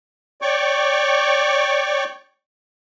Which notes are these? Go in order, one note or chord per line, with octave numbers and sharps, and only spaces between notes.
C#5 D5 G5 C#6 D6